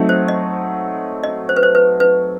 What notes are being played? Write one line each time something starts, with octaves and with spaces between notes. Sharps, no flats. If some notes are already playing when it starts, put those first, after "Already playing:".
Already playing: F#3 A3 C4 D#4
C5
D#5
D#5
C5
B4
C5
B4
B4